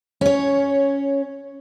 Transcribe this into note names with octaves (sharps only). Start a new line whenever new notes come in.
C#4 C#5